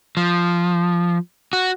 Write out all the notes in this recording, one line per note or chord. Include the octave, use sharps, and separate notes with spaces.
F3
F#4